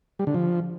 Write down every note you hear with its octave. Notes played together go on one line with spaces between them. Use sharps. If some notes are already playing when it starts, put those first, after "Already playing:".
G3
D3
F3